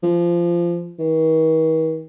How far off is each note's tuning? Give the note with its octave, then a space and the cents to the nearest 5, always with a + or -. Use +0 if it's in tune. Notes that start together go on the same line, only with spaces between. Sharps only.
F3 -20
D#3 +45